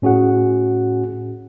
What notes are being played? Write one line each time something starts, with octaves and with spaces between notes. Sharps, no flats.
A2 C#4 F#4 G#4 F#5